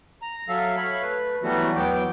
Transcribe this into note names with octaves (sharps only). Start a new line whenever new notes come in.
A#5
F#3 A4 E5 F5
C#5 E5 F5 B5
A3 B4
E3 F#3 G3 A3 B3 F#4
E2 F#3 B3 G5 D6